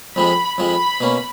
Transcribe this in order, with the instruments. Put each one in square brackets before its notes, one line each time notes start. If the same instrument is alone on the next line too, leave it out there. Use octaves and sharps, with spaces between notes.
[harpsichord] F2 F3 G#3 [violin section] B5
[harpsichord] F2 F3 G#3 [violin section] B5
[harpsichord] B2 A#3 C#4